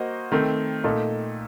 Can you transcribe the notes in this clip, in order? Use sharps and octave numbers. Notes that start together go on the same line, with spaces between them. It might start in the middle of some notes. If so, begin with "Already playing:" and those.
Already playing: A#3 F#4 C5 D#5
D#3 A3 C4
A#2 A3 D#4 A4